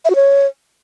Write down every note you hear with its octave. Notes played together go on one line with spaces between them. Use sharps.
E5
F#4
C#5